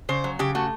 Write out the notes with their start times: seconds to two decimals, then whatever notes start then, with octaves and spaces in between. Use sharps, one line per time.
0.09 C#3 C5
0.24 F#3
0.39 C#3 G4
0.55 A3 F#4